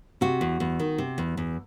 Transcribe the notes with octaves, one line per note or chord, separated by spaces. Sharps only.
C3 F#4
E2
E2
D#3
C3
E2
E2